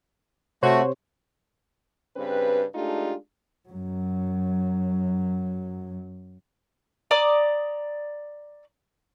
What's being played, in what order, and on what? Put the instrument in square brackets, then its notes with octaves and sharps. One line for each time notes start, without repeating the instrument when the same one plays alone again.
[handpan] C3 [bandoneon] A3 [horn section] F#4 [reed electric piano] C5 C#5
[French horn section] G2 C#3 C4 B4
G#3 A3 D4 D#4 F4 G4
[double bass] F#2 F#3
[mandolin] D5 A#5 D6 D#6